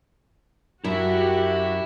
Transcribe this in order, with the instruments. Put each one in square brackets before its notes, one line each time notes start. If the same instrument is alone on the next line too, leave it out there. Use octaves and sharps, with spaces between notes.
[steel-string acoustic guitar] F#2 [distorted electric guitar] E4 E5 [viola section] F#4 G4